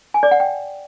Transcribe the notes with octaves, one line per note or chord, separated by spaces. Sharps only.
G#5
D5
F#5
G5